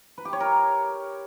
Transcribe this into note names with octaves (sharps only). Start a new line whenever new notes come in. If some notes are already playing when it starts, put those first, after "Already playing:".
B4
G4
C#5
A#4